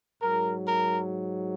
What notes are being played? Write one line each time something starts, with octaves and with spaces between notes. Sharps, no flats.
G#2 F#3 A#4
A#4